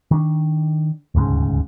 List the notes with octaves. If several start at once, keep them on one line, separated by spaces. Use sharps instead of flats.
D#3 D4
D#1 D2 G#2 C#3